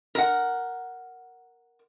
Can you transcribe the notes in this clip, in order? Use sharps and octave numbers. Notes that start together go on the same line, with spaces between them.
A#4 F#5